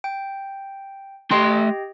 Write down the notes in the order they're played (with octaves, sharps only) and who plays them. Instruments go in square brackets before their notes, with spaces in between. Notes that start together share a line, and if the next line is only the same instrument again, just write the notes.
[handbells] G5
[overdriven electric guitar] A3 C6 [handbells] G4 D#5 G5